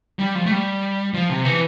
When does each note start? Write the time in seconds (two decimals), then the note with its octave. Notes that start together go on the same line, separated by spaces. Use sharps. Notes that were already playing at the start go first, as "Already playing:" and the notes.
0.19 G3
0.35 F3
0.46 A3
0.51 G3
1.14 F3
1.30 C3
1.45 E3